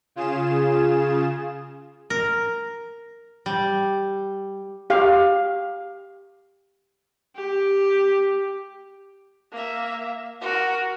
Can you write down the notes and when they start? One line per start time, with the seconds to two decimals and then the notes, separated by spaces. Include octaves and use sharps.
0.15 C#3 F4 G#4 E7
2.10 A#4
3.46 G3
4.90 G4 F5
7.36 G4
9.52 A#3 E5
10.41 F#4 A#4